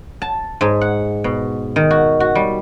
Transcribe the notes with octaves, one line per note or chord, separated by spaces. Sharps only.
A5
G#2
F#5
B2
D#3
F#4
F#4
G3